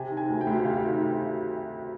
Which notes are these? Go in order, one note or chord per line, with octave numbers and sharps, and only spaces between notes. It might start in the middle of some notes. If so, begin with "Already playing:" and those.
Already playing: C3 G#5
D#3
G#5
D2
G5
D2
C3 F5
D#3